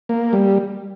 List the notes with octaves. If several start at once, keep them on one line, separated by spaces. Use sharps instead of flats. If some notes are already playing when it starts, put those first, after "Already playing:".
A#3
G3